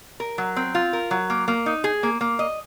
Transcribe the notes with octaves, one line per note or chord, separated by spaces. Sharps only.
A#4
F#3
C4
F4
A#4
F#3
A#3
A#3
D#4
G#4
A#3
A#3
D#5